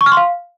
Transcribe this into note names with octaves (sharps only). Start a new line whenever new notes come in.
C#6
F6
C6
F5